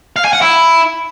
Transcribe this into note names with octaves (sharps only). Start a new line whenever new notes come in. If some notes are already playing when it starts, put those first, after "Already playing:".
F5
G#5
F#5
E4